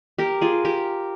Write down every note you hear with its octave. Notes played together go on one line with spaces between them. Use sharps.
G4 A#4
F4 G#4
G4 A#4